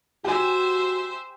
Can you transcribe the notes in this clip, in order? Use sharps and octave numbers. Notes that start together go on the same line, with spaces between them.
F#4 G4 C5 E5 G#5